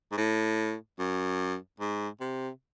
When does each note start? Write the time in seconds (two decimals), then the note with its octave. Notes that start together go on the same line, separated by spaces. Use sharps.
0.12 G#2
0.18 A2
0.99 F#2
1.80 G#2
2.20 C3